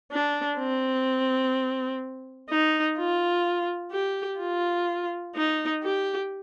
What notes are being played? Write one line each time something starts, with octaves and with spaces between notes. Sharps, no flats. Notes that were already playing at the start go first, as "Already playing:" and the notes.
D4
C4
D#4
F4
G4
F4
D#4
G4